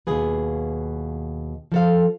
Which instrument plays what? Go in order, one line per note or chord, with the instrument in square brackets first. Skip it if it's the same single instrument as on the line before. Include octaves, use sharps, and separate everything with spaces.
[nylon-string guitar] D#2 B2 F4 G#4 B4
F3 A4 F5